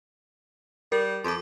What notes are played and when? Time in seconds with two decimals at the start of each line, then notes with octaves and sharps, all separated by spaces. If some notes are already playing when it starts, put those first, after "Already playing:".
0.92 G3 A#4
1.24 F2 C6 D6